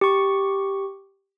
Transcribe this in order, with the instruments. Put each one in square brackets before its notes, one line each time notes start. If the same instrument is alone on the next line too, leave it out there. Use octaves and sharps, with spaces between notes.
[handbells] G4 C#6